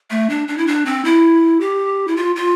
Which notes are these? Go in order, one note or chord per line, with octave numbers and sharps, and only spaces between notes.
A3
D4
D4
E4
D4
C4
E4
G4
E4
F4
F4